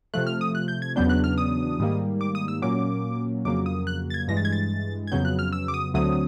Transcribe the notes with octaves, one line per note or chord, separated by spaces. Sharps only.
C3 F3 A3 F#6
F6
D#6
F#6
G6
G#6
E2 C#3 F#3 B3 D4 G6
F#6
F6
D#6
G#2 D#3 G3 A#3
D6
D#6
E6
A#2 F#3 A#3 C#4 D6
F2 C#3 F#3 A#3 D6
D#6
F#6
A6
G#6
G2 E3 G#3 A#6
A6
G#6
A6
G#6
F2 C#3 F#3 B3 G6
F#6
F6
E6
D6
D#6
D2 D3 F#3 A3 C4 D#6